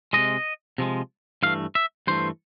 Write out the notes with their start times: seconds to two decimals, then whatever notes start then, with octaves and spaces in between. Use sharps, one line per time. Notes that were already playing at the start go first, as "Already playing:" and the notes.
0.13 C3 F3 G#3 D#5
0.78 C3 F3 G#3
1.43 G2 E3 A3 F5
1.75 E5
2.07 G2 E3 A3 C5